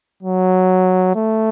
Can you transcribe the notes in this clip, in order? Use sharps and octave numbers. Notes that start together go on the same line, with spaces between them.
F#3
A3